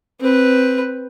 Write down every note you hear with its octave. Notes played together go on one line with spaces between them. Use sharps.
C4 B4